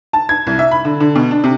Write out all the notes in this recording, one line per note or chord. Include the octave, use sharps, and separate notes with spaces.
A5
G#6
C2
E5
B5
D3
D3
B2
D4
C3